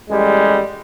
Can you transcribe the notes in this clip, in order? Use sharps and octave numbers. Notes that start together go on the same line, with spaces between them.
A1 G3 G#3